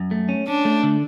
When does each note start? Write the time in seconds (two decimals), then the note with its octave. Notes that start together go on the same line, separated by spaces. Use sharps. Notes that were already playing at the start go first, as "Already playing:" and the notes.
Already playing: F#2
0.11 A3
0.29 C#4
0.47 C#4 D4
0.65 A3
0.83 D3